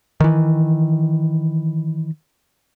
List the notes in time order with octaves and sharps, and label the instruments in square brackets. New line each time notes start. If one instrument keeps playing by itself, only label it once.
[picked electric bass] D#3 E3